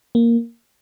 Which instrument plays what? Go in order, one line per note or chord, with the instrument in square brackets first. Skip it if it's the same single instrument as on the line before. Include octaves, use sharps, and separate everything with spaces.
[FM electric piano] A#3